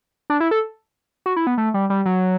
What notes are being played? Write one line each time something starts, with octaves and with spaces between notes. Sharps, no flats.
D4
E4
A4
F#4
E4
B3
A3
G3
G3
F#3